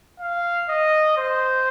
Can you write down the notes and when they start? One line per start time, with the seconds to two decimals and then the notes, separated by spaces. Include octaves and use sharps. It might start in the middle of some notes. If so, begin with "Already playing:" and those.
0.20 F5
0.69 D#5
1.17 C5